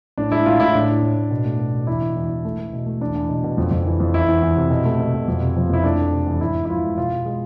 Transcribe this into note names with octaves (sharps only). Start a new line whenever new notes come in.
A2 D4
G#3 E4
A2 F4
A2 E4
A2 D4
A2
A2
A2
B2
A3
B2
B2
E2 E4
B2
E2
E2
A3
A3
B2
A3
E2 D4
E2
B2
B2
F2
F2
E3
F2
E2 E4
E2
E2
C3
B2
A3
B2
B2
F2
C3
F3
F2 E4
A3 D4
A3
C3
E2
G#2 E4
G#2
E4
F3 F4
G#3
B2 F4
B2
G#3